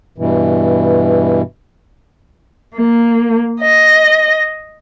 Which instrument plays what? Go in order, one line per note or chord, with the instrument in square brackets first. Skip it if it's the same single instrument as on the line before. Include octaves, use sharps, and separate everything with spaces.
[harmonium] G2 B2 E3
[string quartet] A#3
D#5